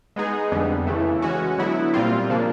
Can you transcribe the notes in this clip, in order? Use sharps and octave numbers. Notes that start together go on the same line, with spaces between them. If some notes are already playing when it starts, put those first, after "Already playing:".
G#3 B3 D#4 G#4
F2 D3 G3 B3
C#3 E3 A3
G#3 C#4 F#4
D3 F#3 B3 E4
A#2 G3 C4 F4
C#3 F3 A#3 D4